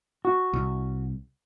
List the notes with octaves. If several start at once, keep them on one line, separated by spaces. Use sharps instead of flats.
F#4
C2